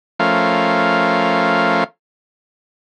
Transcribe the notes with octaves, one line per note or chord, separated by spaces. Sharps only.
F3 A3 C#4 A#4 F5